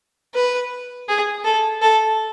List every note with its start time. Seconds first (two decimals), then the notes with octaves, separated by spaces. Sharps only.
0.34 B4
1.08 G#4
1.44 A4
1.82 A4